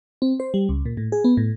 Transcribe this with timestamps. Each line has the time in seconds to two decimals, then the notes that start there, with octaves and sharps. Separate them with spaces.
0.22 C4
0.40 C5
0.54 G3
0.69 C#2
0.85 A#2
0.97 A2
1.12 G#4
1.24 B3
1.37 A2